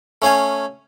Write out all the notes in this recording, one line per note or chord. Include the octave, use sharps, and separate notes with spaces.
A3 C#4 F5 G#5